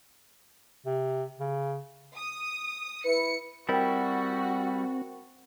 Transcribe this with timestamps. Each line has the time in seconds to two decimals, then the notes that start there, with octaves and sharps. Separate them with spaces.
0.86 C3
1.40 C#3
2.16 D#6
3.05 E4 B4 C#7
3.69 G3 C4 E4 F#4 A#4 G5